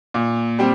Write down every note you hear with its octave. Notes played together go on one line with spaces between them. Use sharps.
A#2
G3 C4